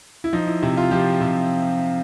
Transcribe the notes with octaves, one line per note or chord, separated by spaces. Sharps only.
E4
F3 D#4
E4
C3 E4
F4
F3 G4
C3